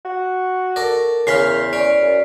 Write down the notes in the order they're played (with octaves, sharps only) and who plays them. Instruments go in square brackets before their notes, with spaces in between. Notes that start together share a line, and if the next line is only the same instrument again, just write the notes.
[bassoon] F#4
[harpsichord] A4 D5 [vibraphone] A#4
[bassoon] E2 [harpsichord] C#3 C#4 C6 [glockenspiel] F6 B6 C7
[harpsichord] C#4 [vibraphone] D5
[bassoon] F#2